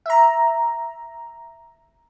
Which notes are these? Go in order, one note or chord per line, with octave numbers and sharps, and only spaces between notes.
E5 A#5